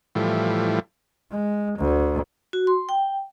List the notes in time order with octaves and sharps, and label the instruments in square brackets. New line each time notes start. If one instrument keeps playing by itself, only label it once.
[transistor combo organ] A2 E3 F3 G3
[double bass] G#3
D2
[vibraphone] F#4
C6
G5